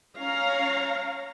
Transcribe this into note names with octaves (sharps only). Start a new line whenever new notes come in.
C#4 C#5 F5 A#5